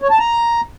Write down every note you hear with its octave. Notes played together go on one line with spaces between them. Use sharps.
C#5
A5
A#5